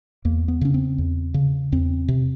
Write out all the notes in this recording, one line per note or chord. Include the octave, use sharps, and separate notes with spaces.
E2 A#3
B3
C#3 C#4
C4
E2
C#3
E2 C4
C3